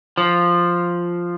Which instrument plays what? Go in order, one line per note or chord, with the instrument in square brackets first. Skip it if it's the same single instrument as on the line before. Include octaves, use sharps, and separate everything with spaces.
[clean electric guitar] F3